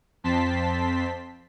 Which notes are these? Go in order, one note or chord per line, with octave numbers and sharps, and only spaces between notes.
F2 C4 A5 C6 B6